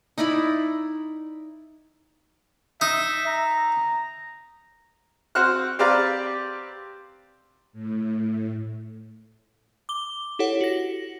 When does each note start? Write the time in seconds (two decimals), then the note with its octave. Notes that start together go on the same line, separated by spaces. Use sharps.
0.18 D#4 E4 D5 B5
2.81 D#4 E5
3.27 A#5
5.35 C4 F#4 C5 F6 F#6
5.79 C4 G4 B4 D5 F5 A#5
7.73 A2
9.89 D6 G7
10.39 E4 G4 A4 C#5 F#5
10.61 F#4 A#6